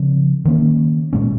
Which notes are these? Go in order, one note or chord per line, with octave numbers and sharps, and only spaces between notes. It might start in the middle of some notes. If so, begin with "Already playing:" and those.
Already playing: C#3 F3 C4
D#3 A#3 C#4
A#2 G#3 C#4